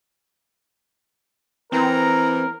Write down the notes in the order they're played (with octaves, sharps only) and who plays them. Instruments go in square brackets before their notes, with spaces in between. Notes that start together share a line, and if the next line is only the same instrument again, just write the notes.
[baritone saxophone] E3 [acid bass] C4 [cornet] A#4 [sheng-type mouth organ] A#5